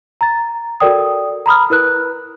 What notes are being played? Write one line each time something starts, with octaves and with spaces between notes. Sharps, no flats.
A#5 A6
F#4 A4 A#4 D5 G5 D#6
A#5 B5 D#6 F6
E4 A#4 B4 F#6